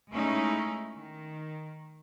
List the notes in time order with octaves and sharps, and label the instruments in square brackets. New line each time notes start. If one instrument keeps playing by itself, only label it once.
[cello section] G#3 A3 C#4 D#4 E4 G#4
D#3